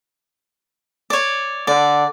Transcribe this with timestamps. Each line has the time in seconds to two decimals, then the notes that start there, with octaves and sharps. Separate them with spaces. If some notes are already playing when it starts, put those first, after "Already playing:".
1.10 C#5 D5
1.67 D3 D5